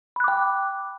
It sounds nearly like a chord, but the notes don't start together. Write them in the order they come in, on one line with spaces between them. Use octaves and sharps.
B5 F#6 D6 G5